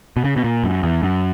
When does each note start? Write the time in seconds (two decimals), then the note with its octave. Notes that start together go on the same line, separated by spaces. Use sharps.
0.17 B2
0.24 C#3
0.36 B2
0.44 A#2
0.64 F#2
0.83 E2
1.03 F#2